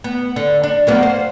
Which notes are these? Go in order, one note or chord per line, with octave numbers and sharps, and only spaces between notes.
B3
D3
D4
F#3 A#3 B3
C5